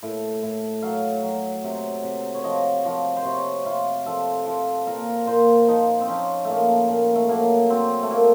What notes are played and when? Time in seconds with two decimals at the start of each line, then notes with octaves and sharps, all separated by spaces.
0.03 A2
0.43 A2
0.82 F#3 F5
1.23 F#3
1.64 C3
2.04 C3
2.35 C#5
2.44 F3 D#5
2.85 F3
3.17 C5
3.25 C3 C#5
3.65 C3 F4
4.06 F3 A4
4.46 F3
4.87 A#2 A#4
5.27 A#2 C5
5.68 F3 D#4
6.01 C4
6.08 F3 C#4
6.45 A#2 A3 A#3
6.88 A#2
7.15 A3
7.29 F#3 A#3
7.70 F#3 C4
8.03 A3
8.10 A#2 A#3